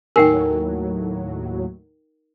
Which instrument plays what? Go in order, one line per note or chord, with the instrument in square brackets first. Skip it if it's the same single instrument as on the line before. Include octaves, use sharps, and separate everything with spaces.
[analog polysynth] D#2 A2 F#3 [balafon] D#4 G#5 [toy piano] A#4 G5